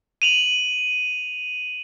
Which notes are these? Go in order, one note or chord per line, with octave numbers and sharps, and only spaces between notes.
D#7 F7 F#7